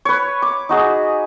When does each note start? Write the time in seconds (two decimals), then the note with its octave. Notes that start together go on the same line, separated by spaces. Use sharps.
0.05 B4 C#5
0.42 D6
0.69 D#4 F#4 G#4